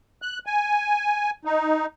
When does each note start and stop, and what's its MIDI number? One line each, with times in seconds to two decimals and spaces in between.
0.22 0.39 90
0.46 1.30 80
1.45 1.86 63